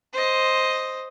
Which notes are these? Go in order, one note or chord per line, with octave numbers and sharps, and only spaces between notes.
C5 D#5